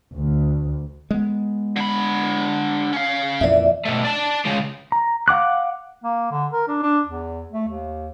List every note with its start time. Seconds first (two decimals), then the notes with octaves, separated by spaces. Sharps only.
0.13 D2
1.11 G#3 B3
1.76 D3 B5
2.93 C#4 F5
3.41 F2 A#2 E3 D5 E5
3.85 B2 A3
4.05 D5 A5
4.46 C#3 G#3
4.92 A#5
5.28 F5 F#5 D6 F#6
6.04 A#3
6.31 D3
6.52 A#4
6.68 D4
6.82 D4
7.06 E2
7.51 A3
7.67 D#2